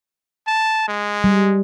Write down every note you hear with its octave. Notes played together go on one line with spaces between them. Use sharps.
A5
G#3
G3